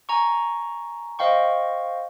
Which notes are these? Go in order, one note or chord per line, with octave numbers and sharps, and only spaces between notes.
G#5 A#5 C#6
C5 D#5 F5 G5 C#6